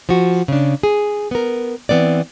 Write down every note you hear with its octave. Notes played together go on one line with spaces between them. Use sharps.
F3 F#4
C#3 D4
G#4
B3 A#4
E3 B3 C4 D5